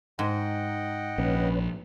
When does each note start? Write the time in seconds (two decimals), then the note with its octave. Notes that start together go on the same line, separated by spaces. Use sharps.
0.19 G#2 D#5 F#5 G5
1.18 A#1 C#4 B4